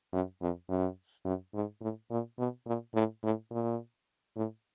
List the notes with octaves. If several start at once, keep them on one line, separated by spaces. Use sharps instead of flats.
F#2
F2
F#2
F#2
G#2
A2
A#2
B2
A#2
A2
A2
A#2
A2